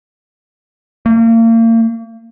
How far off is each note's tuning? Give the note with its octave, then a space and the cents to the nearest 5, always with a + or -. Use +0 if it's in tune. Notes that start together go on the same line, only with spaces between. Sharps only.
A#3 -35